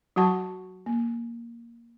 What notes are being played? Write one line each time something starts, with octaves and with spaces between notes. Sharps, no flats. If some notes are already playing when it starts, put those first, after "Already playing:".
F#3 F#4 F#5 A5 C#6
A#3